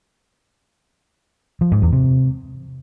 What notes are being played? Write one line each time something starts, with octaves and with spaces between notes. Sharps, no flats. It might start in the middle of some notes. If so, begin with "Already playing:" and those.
F3
G#2
E2
C3